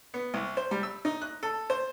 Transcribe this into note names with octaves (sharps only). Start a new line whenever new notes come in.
B3
C2
C5
G3
E6
D#4
F#6
A4
C5